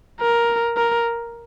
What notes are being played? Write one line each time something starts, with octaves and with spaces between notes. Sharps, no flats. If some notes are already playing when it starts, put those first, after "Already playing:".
A#4
A#4